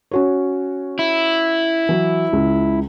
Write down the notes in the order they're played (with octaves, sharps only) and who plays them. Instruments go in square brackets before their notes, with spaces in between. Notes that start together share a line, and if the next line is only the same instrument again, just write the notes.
[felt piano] C#4 F#4 C#5
[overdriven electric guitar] E4
[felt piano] E3 F#3
C#2